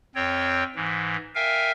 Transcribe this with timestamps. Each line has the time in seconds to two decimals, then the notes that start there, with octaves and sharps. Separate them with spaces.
0.15 F2 C4 C#5 G5
0.76 G#2 E3
1.35 A#4 E5 F5 G5 G#5